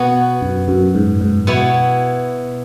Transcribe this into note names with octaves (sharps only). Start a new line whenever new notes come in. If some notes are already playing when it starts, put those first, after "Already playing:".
Already playing: B2 B3 F#4 C#5
F#2
F#2
G#2
G#2
B2 B3 E4 C#5